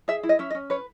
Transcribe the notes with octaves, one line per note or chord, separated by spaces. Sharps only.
G#4 E5
E4
D#5
C#4 E5
D#5
C#4
B4 C#5